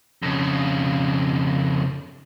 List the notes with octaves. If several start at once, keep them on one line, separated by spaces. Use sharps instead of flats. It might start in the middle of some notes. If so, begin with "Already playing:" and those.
F2 C#3